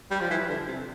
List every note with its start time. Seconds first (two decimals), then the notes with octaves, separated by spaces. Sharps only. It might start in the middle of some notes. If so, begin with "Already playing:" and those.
0.11 G3
0.21 F3
0.31 E3
0.49 D3
0.67 C3